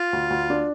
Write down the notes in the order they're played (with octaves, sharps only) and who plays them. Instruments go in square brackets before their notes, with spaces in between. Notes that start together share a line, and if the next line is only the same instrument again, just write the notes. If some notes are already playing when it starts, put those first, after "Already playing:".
Already playing: [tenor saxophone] F4
[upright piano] D2
D2
D4